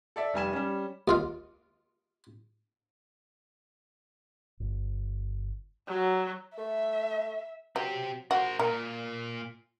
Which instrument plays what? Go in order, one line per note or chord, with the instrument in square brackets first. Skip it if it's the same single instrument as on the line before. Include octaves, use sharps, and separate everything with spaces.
[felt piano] A4 D5 E5
F1 G3 G#5 E7
G3 C#4
[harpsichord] D#2 F4 F5
[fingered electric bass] G1
[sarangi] F#3
[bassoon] A3 [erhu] E5
[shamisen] F#3 [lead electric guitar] C4 G4
[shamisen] F#4 [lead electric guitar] A#4 C5
[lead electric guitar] A#2 A#3 [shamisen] A#4